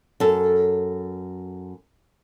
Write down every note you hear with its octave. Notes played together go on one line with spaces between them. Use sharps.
F#2 A4